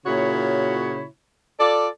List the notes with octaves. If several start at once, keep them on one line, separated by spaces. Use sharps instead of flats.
A#2 C#3 E4 F#4 C#5
F4 A4 D5